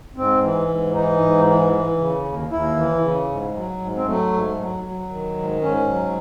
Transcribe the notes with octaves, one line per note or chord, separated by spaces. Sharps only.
G#2 C4
E3
G#2
E3 D#4
G#2
E3
E3
C#3
D#2
D#2 E4
E3
C#3
G#2
F#3
G#2
C4
F#3 A3
G#2
F#3
F#3
D#3
G#2
G#2 C#4
F#3